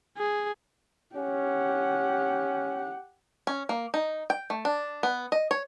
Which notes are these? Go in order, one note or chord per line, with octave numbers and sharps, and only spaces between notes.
G#4
C#4 G4 F#5
C#4
A#3
D#4
G5
A3
D4
B3
D#5
C#5